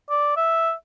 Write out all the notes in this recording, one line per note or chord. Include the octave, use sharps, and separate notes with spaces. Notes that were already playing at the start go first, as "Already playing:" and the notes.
D5
E5